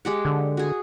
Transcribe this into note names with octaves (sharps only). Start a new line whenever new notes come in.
G#3 G4 F#5
D3
F#4 G#4